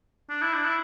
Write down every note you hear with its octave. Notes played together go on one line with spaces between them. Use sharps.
D4
E4
D4
E4